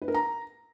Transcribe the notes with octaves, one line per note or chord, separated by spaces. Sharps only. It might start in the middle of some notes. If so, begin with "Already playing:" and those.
B4
A#4
A#5